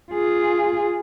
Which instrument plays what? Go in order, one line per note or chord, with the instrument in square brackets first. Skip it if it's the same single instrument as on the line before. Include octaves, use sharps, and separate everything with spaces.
[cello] F4 G#4